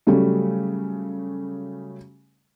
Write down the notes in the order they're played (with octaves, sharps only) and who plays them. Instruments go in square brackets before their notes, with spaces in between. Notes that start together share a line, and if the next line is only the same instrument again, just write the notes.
[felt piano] C#3 F#3 G3 A3 C#4